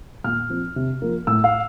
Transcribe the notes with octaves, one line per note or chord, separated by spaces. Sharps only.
A#2 F6
F3 C4
C3
F3 A#3
A2 E6
F5